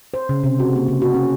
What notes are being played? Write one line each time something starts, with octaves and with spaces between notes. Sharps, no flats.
C5
C#3
C3
F#4
A#3
C#3
F#4
C#4